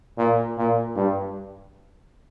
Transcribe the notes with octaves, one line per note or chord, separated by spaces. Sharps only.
A#2
A#2
G2